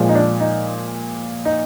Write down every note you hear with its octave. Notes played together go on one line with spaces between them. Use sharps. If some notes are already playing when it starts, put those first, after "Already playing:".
Already playing: A#2 F3 G#3
D#4
D4
D#4
D#4